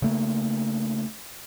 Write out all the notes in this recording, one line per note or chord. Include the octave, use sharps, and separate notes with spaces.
C#3 A3 A#3